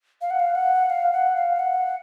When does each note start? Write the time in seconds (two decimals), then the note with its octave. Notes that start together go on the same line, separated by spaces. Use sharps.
0.21 F5
0.30 F#5
0.39 F5
0.55 F#5
0.90 F5
1.12 F#5
1.36 F5
1.59 F#5